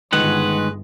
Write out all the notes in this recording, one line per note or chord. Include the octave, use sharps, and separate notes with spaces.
G1 D#3 G#3 B4 F#5